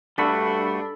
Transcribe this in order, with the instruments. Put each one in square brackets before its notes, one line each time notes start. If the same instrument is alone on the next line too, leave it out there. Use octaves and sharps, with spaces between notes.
[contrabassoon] G2 [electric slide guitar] G3 A3 F#4 [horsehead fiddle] D4 [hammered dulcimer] A4 B5